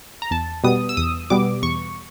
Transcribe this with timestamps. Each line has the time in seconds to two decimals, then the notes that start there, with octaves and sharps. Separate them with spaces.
0.22 A#5
0.31 E2 A5
0.64 B2 G3 B3 D#6
0.89 E6
0.97 E2 D#6
1.30 B2 G3 B3 D6
1.63 E2 C#6